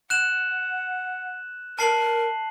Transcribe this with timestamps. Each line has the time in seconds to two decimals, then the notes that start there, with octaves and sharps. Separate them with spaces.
0.10 F#5 F#6 E7 F#7
1.79 A#4 A5 C7 F#7